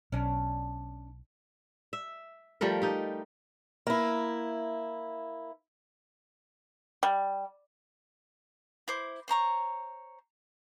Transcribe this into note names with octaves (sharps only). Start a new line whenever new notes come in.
B1 C#4 D4
E5
F3 G3 A3 A#4
D#4 G4
A#3 E4
G3
E4 C5 D6
C5 C#5 A#5 C#6